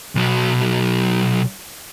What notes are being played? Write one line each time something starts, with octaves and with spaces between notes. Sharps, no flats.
B1 F#3